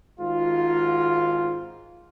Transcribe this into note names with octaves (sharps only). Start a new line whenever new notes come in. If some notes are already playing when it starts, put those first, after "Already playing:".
G#1 G#2 F4